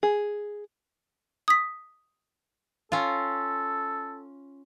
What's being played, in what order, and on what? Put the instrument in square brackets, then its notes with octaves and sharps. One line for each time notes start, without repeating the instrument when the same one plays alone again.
[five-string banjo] G#4
[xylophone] D#6 B6
[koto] C#4 F4 [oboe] A4